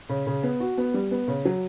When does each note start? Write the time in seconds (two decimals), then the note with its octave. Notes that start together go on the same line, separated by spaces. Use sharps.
0.09 C#3
0.27 C#3
0.43 B3
0.60 F#4
0.78 B3
0.94 G3
1.11 B3
1.28 C#3
1.45 F#3